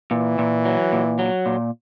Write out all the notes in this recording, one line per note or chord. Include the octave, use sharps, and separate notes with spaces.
A#2 E3
A#2
F#3
A#2
F#3
A#2